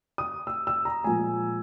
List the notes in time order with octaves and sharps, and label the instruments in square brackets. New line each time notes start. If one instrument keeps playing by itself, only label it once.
[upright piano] D#6
E6
E6
A#5
A#2 F3 G#3 G#5